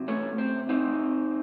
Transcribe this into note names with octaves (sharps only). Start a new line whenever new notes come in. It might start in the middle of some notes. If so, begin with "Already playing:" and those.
Already playing: C3 F#3
A3 C#4
C4
C4 D#4